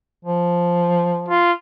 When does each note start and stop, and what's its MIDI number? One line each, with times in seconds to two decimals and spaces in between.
0.25 1.40 53
1.28 1.52 65